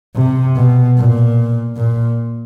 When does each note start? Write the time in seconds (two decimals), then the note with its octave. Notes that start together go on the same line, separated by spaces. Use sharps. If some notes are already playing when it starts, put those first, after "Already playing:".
0.16 C3
0.56 B2
0.97 A#2
1.77 A#2